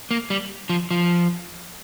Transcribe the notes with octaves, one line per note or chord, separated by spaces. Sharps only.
A#3
G3
F3
F3